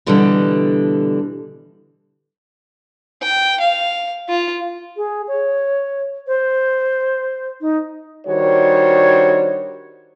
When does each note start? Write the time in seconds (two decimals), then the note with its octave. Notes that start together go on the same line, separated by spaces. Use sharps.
0.06 B2 D3 E3 G3 D4 A4
3.23 G5
3.60 F5
4.29 F4
4.97 G#4
5.28 C#5
6.27 C5
7.61 D#4
8.27 D#3 G3 D4 F#4 C5 C#5